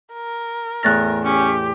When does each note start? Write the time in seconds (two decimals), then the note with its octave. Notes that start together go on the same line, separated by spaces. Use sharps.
0.14 A#4
0.83 E2 A2 F6 F#6 A6 A#6
1.24 C#4 G4